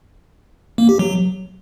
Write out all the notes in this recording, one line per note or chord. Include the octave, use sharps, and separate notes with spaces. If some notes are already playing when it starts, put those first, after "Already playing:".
A#3
G4
F#3